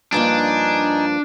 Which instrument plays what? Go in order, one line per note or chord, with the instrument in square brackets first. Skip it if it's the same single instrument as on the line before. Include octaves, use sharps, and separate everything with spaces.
[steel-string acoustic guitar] G2 F3 A#3 [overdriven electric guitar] D4 [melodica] D#4 G#5